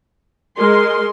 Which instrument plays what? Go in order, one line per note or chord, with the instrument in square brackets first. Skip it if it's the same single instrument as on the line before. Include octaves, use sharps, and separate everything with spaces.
[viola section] G#3 C6 [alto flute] A#4